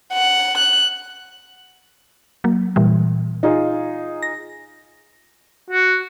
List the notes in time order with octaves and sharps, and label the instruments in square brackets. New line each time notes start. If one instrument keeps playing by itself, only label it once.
[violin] F#5
F#6
[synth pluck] F#3 A#3
A#2 E3 G3
[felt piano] D#4 F4 G#4
[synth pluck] A#6
[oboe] F#4